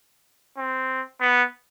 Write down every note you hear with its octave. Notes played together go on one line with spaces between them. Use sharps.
C4
B3